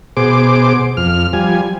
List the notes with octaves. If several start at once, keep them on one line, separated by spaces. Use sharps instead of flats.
B2 G#4 C5 D6
F2 F6
F3 G3 G#5